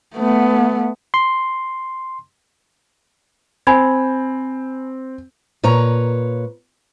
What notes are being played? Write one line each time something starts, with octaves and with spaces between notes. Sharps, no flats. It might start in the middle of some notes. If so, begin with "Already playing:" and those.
A3 B3
C6
C4 G#5 B5 G#6
A#2 B4 C#5 A#5